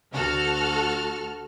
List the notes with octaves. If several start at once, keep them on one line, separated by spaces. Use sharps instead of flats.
D2 F#4 A4 F6